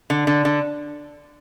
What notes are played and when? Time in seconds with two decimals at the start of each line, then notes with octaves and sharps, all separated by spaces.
0.10 D3
0.27 D3
0.45 D3